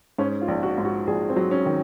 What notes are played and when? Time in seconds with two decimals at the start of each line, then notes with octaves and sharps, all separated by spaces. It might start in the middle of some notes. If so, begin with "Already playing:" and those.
0.18 G#2 C#4
0.41 F4
0.48 A#1
0.63 F#4
0.78 G#2
0.85 F#4
1.07 A#1 G#4
1.29 C4
1.36 F#3
1.51 C#4
1.66 D#3